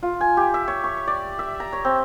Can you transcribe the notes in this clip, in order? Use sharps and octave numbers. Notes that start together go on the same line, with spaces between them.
F4
G#5
G4
E5
C#5
C#6
D5
E5
A#5
C#5
C4